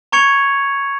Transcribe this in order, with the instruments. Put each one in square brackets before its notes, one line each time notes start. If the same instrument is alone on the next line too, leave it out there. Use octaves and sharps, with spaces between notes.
[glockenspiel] A#5 C#6 G#6 C#7 F7